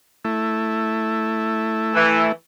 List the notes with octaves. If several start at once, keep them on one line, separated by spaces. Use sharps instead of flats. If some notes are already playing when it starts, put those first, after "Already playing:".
A3 E4
E3